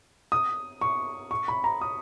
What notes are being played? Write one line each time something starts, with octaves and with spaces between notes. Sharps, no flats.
D#6
C#6
C#6
B5
A#5
D#6